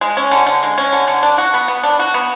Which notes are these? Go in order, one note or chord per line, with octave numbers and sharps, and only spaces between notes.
G#3
C#4
D3
D3
G#3
C#4
D3
D3
D4
F#4
B3
B3
D4
F#4
B3